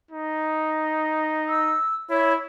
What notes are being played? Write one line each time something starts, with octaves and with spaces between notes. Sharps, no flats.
D#4
E6
E4 C#5